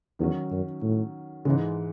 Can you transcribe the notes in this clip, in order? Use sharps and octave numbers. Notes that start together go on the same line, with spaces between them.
E2 D#3 F#3 C#4
F#2
A2
G#2 C#3 E3 G#3